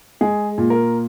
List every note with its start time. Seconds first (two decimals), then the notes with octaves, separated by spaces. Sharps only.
0.21 G#3 G#4
0.58 A#2
0.70 A#4